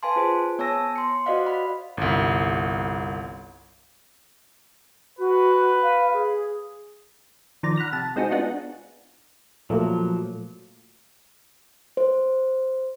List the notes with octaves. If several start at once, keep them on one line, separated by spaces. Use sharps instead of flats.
B4 F5 G#5 A5 C6
F4 G#4 C5
B3 C#5 G#5 A5 E6 A#6
C6 C#7
F#4 C5 D5 D#5 F5 F#5
B5
G1 C2
F#4 B4
F5
G#4
D#3 F3 D5 A#5
F#5 B5 F6 A#6
C3 A5
G#3 C4 D#4 F#4 G#4
B3 D4 D#4 F4 F#4 G#4
A#2 F3 F#3 A3 A#3
C5